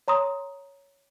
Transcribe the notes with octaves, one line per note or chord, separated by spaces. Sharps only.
C#5 A#5 C6 D#6